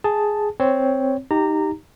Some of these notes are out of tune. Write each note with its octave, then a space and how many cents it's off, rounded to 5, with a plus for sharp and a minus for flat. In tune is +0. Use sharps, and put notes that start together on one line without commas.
G#4 +0 A5 +0
C4 +0 C#5 +5
D#4 +10 G4 +0 A#5 -20